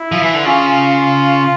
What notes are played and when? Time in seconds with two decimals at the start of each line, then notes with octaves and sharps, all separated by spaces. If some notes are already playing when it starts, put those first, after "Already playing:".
Already playing: E4
0.12 F3
0.22 E3
0.34 D3
0.45 C#3 F4